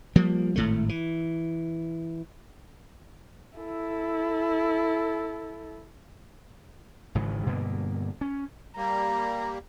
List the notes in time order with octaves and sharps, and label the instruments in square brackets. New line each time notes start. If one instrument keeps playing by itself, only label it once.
[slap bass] F3 G3 A#3
G#1 A2 A3
E3
[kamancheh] E4 A4
[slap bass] G#1 G#2 C#3 E3
G2 B2 D3 A#3
C#4
[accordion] G3 A#3 [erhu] A#5